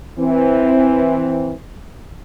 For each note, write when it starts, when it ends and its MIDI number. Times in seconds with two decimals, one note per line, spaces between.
0.19 1.52 52
0.19 1.52 60